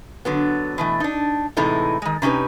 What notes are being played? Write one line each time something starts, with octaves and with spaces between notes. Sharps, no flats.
D3 F#3 B3
B2 E3 A3
D4 D#4
A2 C3 E3 G#3 D#4 A4
D#3 G#3
C3 C#4 D#4 G4 B4